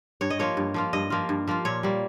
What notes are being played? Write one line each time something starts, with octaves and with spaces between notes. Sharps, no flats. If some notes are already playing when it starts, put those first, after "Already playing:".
G2 C#5
D#5
F3 A#3 F4 C#5
G2
F3 A#3 F4
G2 D#5
F3 A#3 F4
G2
F3 A#3 F4
A#2 C#5
G3 A#3